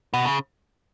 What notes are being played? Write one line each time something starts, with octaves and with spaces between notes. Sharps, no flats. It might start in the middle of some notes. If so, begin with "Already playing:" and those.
B2
C#3